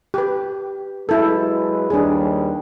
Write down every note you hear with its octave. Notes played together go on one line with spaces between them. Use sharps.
G4 B4
F#3 G#3 E4 A4 B4
D#2 G3 D4 G#4